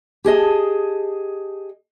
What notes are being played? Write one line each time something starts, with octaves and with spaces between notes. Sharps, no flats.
G4 G#4 D#5 A5